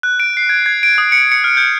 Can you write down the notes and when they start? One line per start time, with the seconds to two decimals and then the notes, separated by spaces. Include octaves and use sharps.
0.03 F#6
0.20 D7
0.37 C7
0.49 G#6
0.66 G#6
0.83 D7
0.98 D#6
1.12 C#7
1.32 C#7
1.44 F6
1.57 G6